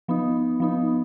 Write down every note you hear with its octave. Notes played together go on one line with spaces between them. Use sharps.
F3 B3 D#4
F3 B3 D#4